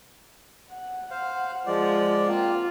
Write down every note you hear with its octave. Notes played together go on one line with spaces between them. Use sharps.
F#5
C5 F5
F3 G#3 D5
A#3 C4 F4